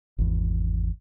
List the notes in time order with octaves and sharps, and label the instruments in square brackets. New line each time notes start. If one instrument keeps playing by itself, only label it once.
[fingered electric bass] G#1 E2